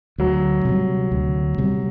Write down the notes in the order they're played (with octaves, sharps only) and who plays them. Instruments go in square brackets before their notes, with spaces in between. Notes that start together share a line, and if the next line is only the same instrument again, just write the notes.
[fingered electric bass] D2 [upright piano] F#3
[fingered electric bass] C3 G3
D2
C3 G3